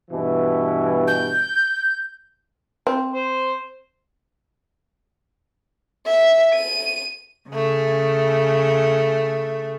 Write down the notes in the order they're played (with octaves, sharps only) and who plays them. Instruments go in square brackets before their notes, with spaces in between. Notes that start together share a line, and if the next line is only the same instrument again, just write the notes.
[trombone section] G2 B2 E3
[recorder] G6
[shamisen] C4
[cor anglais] C5
[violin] E5
D#7
[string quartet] C#3 A3